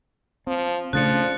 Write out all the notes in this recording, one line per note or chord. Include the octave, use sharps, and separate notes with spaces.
F3 C4
C#3 F3 A3 D4 F#6 A6 C#7